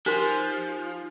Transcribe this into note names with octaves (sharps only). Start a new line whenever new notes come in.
F3 D#4 G4 A#4 C6